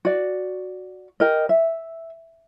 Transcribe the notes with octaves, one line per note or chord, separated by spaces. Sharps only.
F#4 D5
G4 A#4 D#5
E5